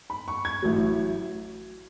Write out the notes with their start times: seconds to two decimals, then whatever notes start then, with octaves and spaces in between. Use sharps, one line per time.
0.10 B5
0.28 C#6
0.45 G#6
0.62 A1 A2 F#3